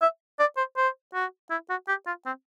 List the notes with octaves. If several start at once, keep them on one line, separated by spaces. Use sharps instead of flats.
E5
D5
C5
C5
F#4
E4
F#4
G4
F4
C4